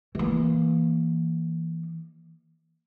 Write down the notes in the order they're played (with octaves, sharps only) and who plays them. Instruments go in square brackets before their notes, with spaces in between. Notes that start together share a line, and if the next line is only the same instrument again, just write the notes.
[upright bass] E3 A#3